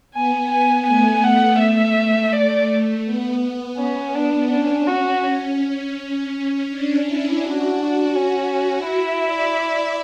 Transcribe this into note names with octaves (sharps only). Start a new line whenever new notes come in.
B3 G#5
G#5
A3 G#5
F#5
E5
A3 D5
B3
B3 C#4
D4
C#4 D4
C#4 F#4
D4
E4
D4 F#4
C#4
E4 E5
D5
D5